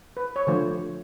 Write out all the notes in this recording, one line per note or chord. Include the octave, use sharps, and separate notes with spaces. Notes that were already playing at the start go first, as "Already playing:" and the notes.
B4
C#5
D3 F3 A3 C5